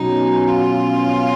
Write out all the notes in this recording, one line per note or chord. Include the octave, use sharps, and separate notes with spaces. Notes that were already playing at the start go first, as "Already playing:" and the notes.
Already playing: B2 F#3 C#4 D#4
F4